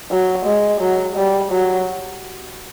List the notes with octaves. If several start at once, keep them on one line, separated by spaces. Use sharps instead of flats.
F#3
G#3
F#3
G3
F#3